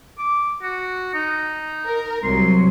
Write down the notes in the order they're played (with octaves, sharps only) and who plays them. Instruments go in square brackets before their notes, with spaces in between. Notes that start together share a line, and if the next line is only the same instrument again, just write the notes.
[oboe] D6
F#4
D#4
[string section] A#4
[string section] C2 F#3 [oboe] C6